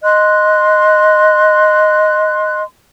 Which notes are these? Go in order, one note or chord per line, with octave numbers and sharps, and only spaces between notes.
D#5 C6 F#6